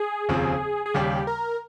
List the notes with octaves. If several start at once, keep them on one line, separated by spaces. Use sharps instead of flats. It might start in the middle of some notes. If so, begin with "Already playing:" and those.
Already playing: G#4
F1 D#2 C#3 F3 C4
G#4
D#2 C#3 G3 G4
A#4